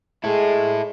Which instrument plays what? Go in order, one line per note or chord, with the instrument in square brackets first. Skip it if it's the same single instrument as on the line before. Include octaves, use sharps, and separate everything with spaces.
[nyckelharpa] G#3 [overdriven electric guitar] E4 A4